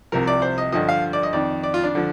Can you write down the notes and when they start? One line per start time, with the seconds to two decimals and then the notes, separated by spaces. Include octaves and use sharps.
0.12 C2 C3 F3 A#4
0.27 D5
0.42 C5
0.58 D#5
0.72 G2 D3 F3 D#5
0.89 F5
1.13 D5
1.23 D#5
1.33 F2 D#3 D5
1.63 D5
1.74 F4
1.84 D4
1.95 D3 F3